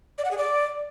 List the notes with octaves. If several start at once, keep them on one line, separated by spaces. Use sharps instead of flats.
D5
F#5
G#4
D5